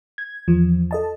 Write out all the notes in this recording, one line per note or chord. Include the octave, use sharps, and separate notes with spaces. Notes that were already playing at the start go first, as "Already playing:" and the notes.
G#6
E2 F3
A4 D#5 A5